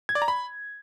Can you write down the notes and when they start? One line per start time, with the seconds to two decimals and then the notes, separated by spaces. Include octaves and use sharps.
0.09 G#6
0.15 D5
0.22 A#5
0.28 B5